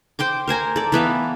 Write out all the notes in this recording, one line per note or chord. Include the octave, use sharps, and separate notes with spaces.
C5 G5 C6 D6
A#4 C5 G#5 A#5
A4 D5
E3 B3 E5 F5